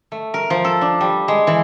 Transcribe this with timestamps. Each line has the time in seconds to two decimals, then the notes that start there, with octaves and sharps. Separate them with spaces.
0.12 A3
0.34 A#4
0.50 F3
0.64 A4
0.81 D4
1.01 G3
1.28 G#3
1.47 E3